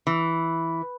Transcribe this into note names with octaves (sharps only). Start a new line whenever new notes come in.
E3